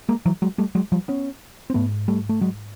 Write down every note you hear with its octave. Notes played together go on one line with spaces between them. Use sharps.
G#3 A#3
E3 F#3
F#3 G#3
G3 A3
F#3 G#3
F3 G3
B3 C#4
C4
G#2 A3 B3
G3 A3
A3
F#3 G#3